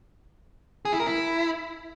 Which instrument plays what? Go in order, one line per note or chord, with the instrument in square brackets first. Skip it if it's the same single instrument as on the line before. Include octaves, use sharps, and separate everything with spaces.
[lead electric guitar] G#4
E4
A#4
E4